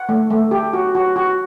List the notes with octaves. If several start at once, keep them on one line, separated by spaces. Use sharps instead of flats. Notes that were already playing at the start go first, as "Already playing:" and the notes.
Already playing: F#5
A3
A3
G4
F#4
F#4
F#4